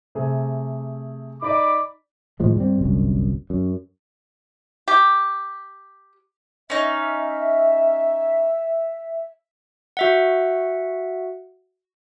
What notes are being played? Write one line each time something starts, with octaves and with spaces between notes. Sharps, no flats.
C3 A3 G#4
D#4 D5 D#5 B5 D6
D#2 A2 F3 G#3
G2 G3 B3 C4
G1 C2 F#2
F#2
G4
C#4 D#4 E5
F#4 E5 F#5